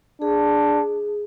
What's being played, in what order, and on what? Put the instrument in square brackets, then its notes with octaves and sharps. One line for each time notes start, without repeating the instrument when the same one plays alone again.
[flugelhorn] D4 [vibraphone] G#4